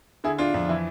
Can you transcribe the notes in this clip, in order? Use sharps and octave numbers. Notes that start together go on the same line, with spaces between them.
D3 E4 G#4
D4 F4
F2 D4
E3 E4